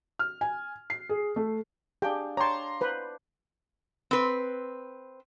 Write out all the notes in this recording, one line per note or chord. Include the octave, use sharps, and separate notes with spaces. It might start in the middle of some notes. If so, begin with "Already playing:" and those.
F6
G#5
C7
G#4
A3
D4 G4 G#4 F5 G5 C6
D4 C#5 G5 A5 A#5 C6
B4 C5
C4 B4